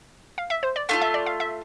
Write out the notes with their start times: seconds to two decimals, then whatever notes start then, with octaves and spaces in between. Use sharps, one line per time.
0.38 F5
0.50 E5
0.63 C5
0.76 D5
0.89 A3 D4 F4 F5
1.01 E5
1.14 D5
1.26 F5
1.40 E5